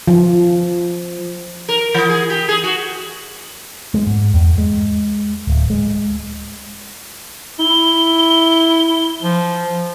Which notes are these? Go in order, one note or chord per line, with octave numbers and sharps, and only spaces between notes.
F3
A#4
E3
G#4
G4
G#4
F#4
G#3
G#2
E2
G#3
D1
G#3
E4 G7
F3